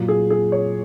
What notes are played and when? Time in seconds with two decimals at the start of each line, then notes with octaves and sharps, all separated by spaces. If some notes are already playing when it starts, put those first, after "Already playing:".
Already playing: A#2 F#3
0.08 G#4
0.30 G#4
0.52 C#5